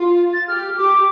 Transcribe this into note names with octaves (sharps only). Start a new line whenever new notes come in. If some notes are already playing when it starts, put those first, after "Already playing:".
Already playing: F4
A6
G4 F6
G4 D6